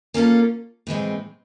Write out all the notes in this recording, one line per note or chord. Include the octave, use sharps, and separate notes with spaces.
A#3 C#4 F4 A4
A2 E3 G#3 C4